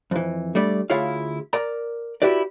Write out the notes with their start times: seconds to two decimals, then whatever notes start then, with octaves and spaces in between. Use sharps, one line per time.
0.11 F2 E3
0.55 G3 A3 D4 D5
0.90 D2 E4 F4 G#4 C#5 F5
1.53 A#4 D5 A#5
2.22 E4 F#4 G4 B4 D5